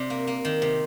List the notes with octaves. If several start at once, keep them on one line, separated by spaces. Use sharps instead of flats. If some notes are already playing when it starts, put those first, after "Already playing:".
Already playing: C3 D4
A#3
A#3
D#3
C3